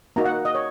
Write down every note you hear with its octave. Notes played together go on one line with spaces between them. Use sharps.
A#3 D#4 F#4 A#5
F#5
D#5
C#5